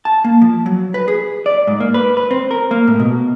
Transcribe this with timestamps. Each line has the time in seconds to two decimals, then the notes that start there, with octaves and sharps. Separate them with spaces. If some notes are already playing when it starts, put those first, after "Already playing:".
0.05 A5
0.25 A#3
0.42 F3
0.66 F#3
0.94 B4
1.08 G#4
1.46 D5
1.67 G#2
1.80 A#3
1.94 B4
2.17 B4
2.31 C4
2.51 A#4
2.71 A#3
2.87 A2
3.00 B2